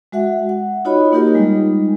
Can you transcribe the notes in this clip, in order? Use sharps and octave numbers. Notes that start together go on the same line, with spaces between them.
G#3 F#4 E5 F#5
F#5
D#4 F4 F#4 C#5 D#5 B5
A#3 D#4 F4 G4 A#4 D#5
G3 G#3 D#4